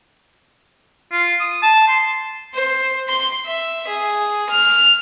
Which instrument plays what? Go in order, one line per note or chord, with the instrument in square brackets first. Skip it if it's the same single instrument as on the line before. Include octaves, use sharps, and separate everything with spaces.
[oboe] F4
D#6
A5
C6
[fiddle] C5
C6
E5
G#4
F6